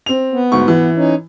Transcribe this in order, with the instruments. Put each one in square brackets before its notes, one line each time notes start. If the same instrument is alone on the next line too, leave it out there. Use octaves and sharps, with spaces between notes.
[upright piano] C4 F7
[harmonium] B3
[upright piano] D2 G#2 C#6
E3
[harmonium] C#4 D#4